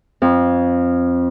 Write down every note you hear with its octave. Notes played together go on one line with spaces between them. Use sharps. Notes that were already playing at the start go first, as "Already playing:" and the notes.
F2